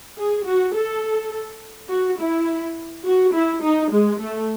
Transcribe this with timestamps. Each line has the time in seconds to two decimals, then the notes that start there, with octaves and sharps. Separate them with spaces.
0.18 G#4
0.46 F#4
0.75 A4
1.90 F#4
2.19 E4
3.06 F#4
3.34 E4
3.63 D#4
3.92 G#3
4.21 A3